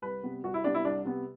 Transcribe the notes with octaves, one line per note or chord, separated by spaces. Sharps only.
C2 B4
C3 G3 B3
C2 F#4
E4
C3 G3 B3 D4
E4
C2 D4
C3 G3 B3